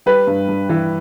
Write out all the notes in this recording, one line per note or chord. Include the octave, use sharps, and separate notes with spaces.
G3 B4
G2
G2
E3